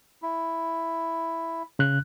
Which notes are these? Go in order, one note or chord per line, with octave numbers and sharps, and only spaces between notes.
E4
C#3 F#6